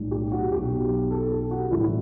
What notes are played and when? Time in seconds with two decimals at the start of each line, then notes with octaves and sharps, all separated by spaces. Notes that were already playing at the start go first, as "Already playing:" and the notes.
Already playing: B1 A2 G3
0.11 G4
0.32 F#4
0.51 B1 B2 F#3 G4
1.11 A4
1.31 G4
1.51 F#4
1.71 A1 A2 E3 G3 E4